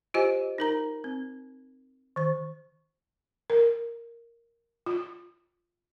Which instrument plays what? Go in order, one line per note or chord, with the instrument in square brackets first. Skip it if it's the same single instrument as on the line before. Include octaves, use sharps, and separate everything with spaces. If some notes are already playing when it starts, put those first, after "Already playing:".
[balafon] F4 G4 C5 D#5 G#5
D#4 A#4 A#5
C4
D#3 C5
A#4
F4